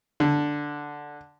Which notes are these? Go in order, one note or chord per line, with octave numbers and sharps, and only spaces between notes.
D3